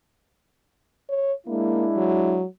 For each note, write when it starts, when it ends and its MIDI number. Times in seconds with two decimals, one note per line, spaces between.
1.09 1.33 73
1.47 2.42 56
1.47 1.85 58
1.47 2.42 62
1.47 2.42 64
1.97 2.45 54